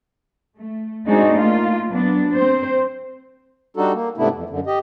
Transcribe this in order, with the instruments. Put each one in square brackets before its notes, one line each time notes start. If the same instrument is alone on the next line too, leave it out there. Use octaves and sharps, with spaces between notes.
[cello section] A3
G#3 C4 D4 D#4 F#4 G#4
A3 A#3 F4
F#3 B3 D4
C4 C5
[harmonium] G3 D4 D#4 F#4 A4
A#3
G#2 C3 A3 B3 D4 E4
F2
F#2 D3
G4 D#5